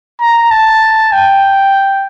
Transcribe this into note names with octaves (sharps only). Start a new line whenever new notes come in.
A#5
A5
G5